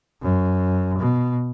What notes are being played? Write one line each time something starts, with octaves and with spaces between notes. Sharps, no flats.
F#2
B2